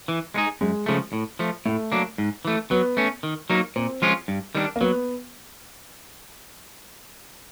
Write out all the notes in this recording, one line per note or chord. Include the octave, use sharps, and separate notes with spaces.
E3
G#3 B3 D#4 G#4
F#2 G#3
C#3 F3 A3
A2
F3 A3
A2 A3
F#3 A#3 D4
G#2
E3 A3
F#3 B3
A3 C#4
D#3
F#3 A#3 D#4
A#2 C4
F3 G#3 C#4 F4
G2
D#3 G3 B3 D4
A#3
F#3 B3